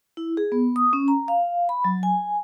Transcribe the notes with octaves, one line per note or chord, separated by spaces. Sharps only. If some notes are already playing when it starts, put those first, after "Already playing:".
E4
G#4
B3
D#6
C#4
A#5
F5
B5
F#3
G#5